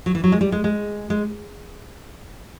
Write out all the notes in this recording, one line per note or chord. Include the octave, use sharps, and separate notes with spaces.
F#3
E3
F#3
G#3
G3
G#3
G#3
G#3